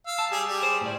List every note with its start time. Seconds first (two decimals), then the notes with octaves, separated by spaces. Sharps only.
0.07 F5 E6
0.18 A5
0.31 G3 G4 G#4
0.47 G3 G4 G#4
0.63 C5
0.81 A2 D5